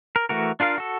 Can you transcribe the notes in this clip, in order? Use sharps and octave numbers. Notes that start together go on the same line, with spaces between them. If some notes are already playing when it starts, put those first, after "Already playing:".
A#4
E3 A3 F#4 A#4
D4 F4 A#4 F5
F#4 A4